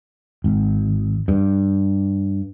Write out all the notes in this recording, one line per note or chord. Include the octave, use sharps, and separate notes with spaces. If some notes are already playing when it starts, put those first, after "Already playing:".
G#1
G2